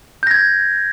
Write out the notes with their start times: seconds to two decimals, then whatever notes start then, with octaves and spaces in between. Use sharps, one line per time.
0.23 G6
0.27 A#6
0.31 G#6